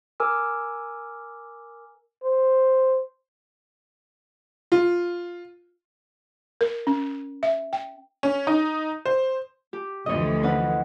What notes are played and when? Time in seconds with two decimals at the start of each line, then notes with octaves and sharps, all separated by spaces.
0.20 A#4 G#5 D6 E6 F6
2.23 C5
4.72 F4
6.61 A#4
6.87 C#4
7.43 E5
7.73 G5
8.23 C#4
8.47 D#4
9.05 C5
9.73 G4
10.06 D2 E3 F3 C#5 D#5
10.43 C#4 B4 F#5